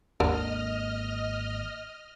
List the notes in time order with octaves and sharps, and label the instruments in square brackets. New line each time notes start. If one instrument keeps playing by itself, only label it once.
[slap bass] G#1 A#3 [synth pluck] D#2 [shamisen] D3 A#4 [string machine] D#5 F6